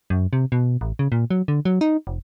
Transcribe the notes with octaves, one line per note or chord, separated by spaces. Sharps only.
F#2
C3
B2
A1
C#3
A#2
F#3
D3
F#3
D#4
F1